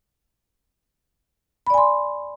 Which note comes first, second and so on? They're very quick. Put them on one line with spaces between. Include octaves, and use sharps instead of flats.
B5 D5 G#5 C6